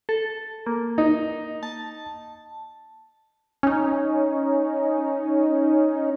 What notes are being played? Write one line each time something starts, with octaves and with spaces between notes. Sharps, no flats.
A4
A#3
D#4
A5
C#4 D#4